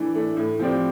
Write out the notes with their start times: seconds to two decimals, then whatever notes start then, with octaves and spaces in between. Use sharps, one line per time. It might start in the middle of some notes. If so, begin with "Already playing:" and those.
Already playing: E3 A3 D4
0.15 A3 D4
0.37 A2
0.59 F3 C4 G4 D5